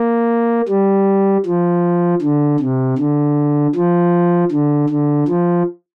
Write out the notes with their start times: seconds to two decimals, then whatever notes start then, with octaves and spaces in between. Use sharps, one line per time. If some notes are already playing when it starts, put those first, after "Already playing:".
Already playing: A#3
0.68 G3
1.46 F3
2.22 D3
2.60 C3
2.98 D3
3.75 F3
4.52 D3
4.90 D3
5.28 F3